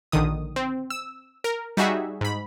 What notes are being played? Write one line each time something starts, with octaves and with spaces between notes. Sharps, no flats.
A#1 D3 D#3 D#6
C4
E6
A#4
G3 D#4 F#4 G#4 E5
G#2 B5